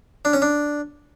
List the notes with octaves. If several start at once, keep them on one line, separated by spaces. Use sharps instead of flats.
D4
C#4
D4